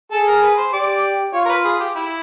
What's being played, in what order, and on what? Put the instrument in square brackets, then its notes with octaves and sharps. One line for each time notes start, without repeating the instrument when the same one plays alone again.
[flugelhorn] G#4 [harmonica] A4
[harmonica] A#4
B4
C5
[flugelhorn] G4 [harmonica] D5
[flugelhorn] F4 [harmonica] C#5
[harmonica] A#4
B4
G#4
G4
E4